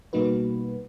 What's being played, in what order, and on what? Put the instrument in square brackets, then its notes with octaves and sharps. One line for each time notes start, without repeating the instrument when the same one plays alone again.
[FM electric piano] B2 G3 A#3 D#4 F#4 B4